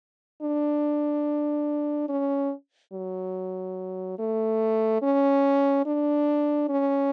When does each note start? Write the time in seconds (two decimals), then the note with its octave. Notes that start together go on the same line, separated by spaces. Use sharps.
0.42 D4
2.09 C#4
2.93 F#3
4.19 A3
5.02 C#4
5.86 D4
6.69 C#4